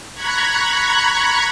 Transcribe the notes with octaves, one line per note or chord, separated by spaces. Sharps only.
A#5 B5 C#6 F#6 G#6